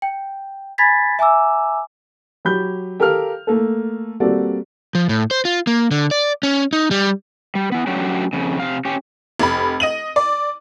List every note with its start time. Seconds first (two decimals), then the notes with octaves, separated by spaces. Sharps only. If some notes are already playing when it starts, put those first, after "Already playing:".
0.02 G5
0.78 G#5 B5 G#6 A6 B6
1.19 E5 G#5 A#5 D6 E6
2.45 F#3 G4 B5 G6
3.00 G4 A4 A#4 F5 F6
3.47 A3 A#3 A4
4.20 G3 A#3 C4 F#4 A4 D5
4.95 F3
5.09 A2
5.31 C5
5.45 F4
5.67 A#3
5.91 D3
6.11 D5
6.43 C#4
6.73 D#4
6.91 G3
7.55 G3
7.72 B3 E4
7.87 F#3 A3 C#4 D4 F#4 G4
8.33 F2 C#3
8.60 C3 F5
8.85 C#4 G4
9.39 F1 B5
9.80 D#5 D#7 F#7
10.16 D5